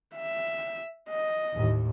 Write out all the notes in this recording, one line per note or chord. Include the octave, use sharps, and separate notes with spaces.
E5
D#5
D#2 A2